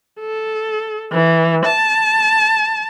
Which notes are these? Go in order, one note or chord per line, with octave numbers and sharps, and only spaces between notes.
A4
E3
A5